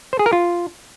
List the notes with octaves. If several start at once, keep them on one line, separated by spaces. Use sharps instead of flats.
C5
G#4
A#4
F4